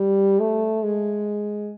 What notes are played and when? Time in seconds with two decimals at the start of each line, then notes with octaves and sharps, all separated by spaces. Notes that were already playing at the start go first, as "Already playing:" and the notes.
Already playing: G3
0.40 A3
0.83 G#3